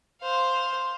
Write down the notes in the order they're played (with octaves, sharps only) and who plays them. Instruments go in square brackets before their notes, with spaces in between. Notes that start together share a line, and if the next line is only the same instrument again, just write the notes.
[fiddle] C5 F5